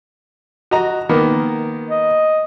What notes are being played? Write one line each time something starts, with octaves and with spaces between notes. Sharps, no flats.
F#4 D#5 A#5
D#3 A#3 B3
D#5